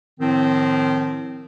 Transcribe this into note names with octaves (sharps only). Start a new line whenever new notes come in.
A2 D#3 F3 C4